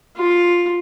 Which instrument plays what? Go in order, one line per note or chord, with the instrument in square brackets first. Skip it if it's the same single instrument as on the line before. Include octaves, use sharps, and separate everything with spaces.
[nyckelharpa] F4